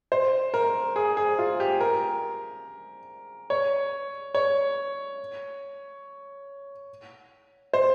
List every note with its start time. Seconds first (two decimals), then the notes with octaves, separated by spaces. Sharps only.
0.12 C5
0.54 A#4
0.96 G#4
1.17 G#4
1.39 F4
1.60 G4
1.81 A#4
3.50 C#5
4.35 C#5
7.73 C5